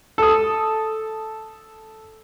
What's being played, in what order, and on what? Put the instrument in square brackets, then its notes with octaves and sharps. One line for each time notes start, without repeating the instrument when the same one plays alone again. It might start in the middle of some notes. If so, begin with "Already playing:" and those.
[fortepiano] A4 D#6